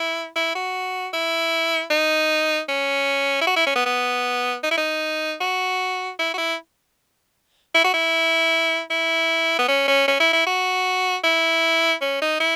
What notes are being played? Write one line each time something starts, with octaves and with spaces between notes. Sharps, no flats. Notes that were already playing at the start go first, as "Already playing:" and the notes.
Already playing: E4
E4
F#4
E4
D#4
C#4
E4
F#4
E4
C#4
B3
B3
D#4
E4
D#4
F#4
E4
F#4
E4
E4
F#4
E4
E4
B3
C#4
C#4
C#4
E4
E4
F#4
E4
C#4
D#4
E4